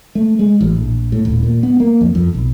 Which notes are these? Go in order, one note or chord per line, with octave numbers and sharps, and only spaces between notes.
A3
G#3
A1
A#1
A2
D#1
A#2
B3
A#3
F2
F2
B1